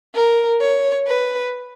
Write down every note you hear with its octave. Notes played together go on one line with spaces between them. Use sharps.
A#4
C#5
B4